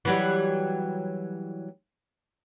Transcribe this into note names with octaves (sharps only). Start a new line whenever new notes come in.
E3 F#3 G3